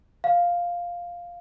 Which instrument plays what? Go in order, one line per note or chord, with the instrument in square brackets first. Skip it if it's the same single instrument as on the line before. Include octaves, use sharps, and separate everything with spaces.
[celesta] F5